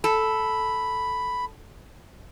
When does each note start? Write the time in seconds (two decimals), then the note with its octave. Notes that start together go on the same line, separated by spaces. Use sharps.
0.04 A4 B5